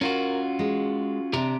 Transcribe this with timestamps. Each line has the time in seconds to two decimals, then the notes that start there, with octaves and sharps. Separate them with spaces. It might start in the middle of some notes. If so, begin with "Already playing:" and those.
0.01 C#4 F4 F#4 A#4
0.59 G#3
1.33 C3 D4 G4 A#5